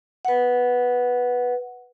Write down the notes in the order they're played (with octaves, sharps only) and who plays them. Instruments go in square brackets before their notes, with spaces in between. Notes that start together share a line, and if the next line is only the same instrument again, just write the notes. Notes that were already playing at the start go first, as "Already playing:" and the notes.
[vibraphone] B4 F#5